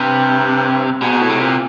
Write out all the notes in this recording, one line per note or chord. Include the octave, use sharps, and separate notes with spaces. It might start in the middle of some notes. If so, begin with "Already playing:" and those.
Already playing: G2 C3
G#2 B2
G#2
A2
C3
A#2